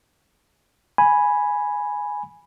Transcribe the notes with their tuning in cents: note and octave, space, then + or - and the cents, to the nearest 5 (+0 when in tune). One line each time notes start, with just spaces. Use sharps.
G#5 +0 B5 -5